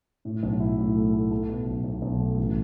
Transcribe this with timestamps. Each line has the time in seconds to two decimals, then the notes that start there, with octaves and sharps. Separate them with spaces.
0.25 A2
0.43 B1
0.60 E4
0.78 A2
0.95 A3
1.13 A3
1.31 A3
1.49 B2
1.67 B1
1.84 B1
2.02 B1
2.20 A3
2.38 A1